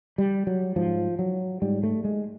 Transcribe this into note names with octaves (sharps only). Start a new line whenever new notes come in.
G3
F#3
G#2 F3
F#3
G#2 G3
A3
G#3